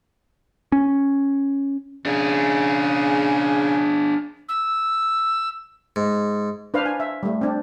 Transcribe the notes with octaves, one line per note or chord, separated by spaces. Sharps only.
C#4
C#3 D4 G#4
E6
G#2
D4 B4 C5 F5
G#5
E5
G3 A3
C4 D4